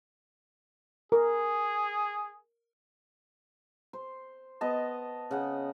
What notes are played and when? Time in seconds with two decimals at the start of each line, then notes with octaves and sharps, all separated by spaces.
1.12 G#4 A#4
3.93 C5
4.61 B3 D#5 A5
5.31 C#3 F#5